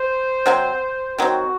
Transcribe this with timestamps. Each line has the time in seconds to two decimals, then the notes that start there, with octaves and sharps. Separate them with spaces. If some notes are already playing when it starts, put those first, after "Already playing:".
Already playing: C5
0.46 C3 F#3 C4
1.18 D#3 F#3 C4 F#4